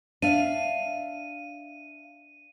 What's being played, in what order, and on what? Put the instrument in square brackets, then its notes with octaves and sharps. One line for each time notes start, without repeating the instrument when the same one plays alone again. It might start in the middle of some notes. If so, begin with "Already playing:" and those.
[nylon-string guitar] D4 [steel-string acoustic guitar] E5 F5 [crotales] D#7